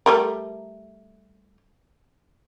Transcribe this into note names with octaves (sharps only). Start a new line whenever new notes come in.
G3 A3 A#4